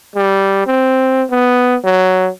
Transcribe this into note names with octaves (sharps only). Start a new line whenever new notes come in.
G3
C4
B3
F#3